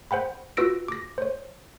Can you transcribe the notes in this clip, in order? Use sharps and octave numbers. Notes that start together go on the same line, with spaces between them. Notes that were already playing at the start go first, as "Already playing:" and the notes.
C5 F#5 G5 B5
F4 F#4 B4 E6 A#6 D7
D6 A#6
C5 C#5